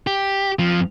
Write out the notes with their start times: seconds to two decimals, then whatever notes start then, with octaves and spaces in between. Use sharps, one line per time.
0.07 G4
0.59 F2 F3